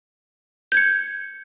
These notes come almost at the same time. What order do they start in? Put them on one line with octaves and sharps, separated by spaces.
G6 G#6 C#7